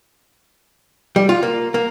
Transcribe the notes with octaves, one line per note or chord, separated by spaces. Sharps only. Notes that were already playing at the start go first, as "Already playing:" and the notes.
G3
F4
A#3
A#3